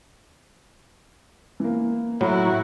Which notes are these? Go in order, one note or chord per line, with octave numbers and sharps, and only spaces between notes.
E3 A#3
A2 F#3 E4 F#4 A#5 B5